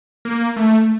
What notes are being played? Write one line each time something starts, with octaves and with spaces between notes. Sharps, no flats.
A#3
A3